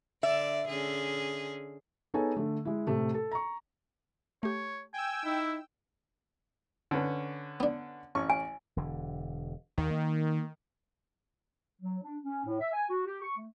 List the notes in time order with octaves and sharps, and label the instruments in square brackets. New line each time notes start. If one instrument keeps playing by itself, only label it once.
[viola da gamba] D3 D5 [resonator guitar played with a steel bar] E5
[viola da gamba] D3 C#4 G#4
[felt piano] B3 D#4 G#4 A4 C#5 G#5
D3 A3
G#3 E4
A2 C3 A3
A4
A#5 C#6
[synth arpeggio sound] A3 G4 [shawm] C#5
[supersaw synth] G5 E6 [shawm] G#5
[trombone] D#4 [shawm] E4
[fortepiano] D3 C#4 B4
[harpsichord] B3 D4
[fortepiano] A1 C#4 C#6
[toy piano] G#5
[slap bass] E1 D3
[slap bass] D#2 [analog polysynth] D#3
[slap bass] A#3
[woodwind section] F#3
D4
C#4
A2
E5
G#5
F#4
G4
C#6
A3